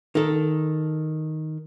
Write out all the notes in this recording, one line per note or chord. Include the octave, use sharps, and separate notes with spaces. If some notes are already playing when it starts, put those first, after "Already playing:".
D#3 A4